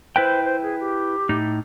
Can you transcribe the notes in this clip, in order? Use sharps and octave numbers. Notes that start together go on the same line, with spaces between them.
E4 B4 C5 G5
C5
G#4
G4
A2 D#4